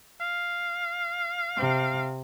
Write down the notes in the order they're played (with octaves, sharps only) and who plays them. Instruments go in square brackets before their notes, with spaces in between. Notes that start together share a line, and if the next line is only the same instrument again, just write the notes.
[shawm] F5
[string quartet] C3